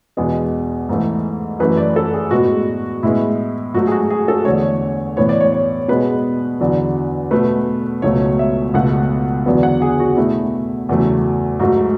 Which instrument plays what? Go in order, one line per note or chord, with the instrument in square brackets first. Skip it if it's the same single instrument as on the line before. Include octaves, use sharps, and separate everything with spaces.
[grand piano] E2 B2 G#3 B3 G#4
G#2 E3 A3
F#2 E3 A3 B4
D5
A4
G#4
A2 G#3 B3 F#4
A2 G#3 B3 E4
G#2 F#3 A3 F#4
G#4
F#4
G#4
A4
E2 D3 A3 C#5
A2 E3 B3 C#5
D5
C#5
C#5
B2 G#3 B3 B4
E2 D3 F#3
B2 A3 B4
C#2 B2 F#3 A3 C#5
E5
C#2 B2 A3 F#5
E2 D3 F#3 B3
F#5
G#4
F#4
B2 A3 E4
E2 C#3 F#3 A3
G#2 F#3 A3 F#4